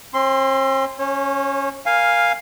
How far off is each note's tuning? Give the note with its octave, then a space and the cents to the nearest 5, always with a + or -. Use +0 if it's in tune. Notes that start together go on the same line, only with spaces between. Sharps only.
C4 +45 C6 +0
C#4 +0 C#5 -35
A#4 +5 F5 +0 G#5 -10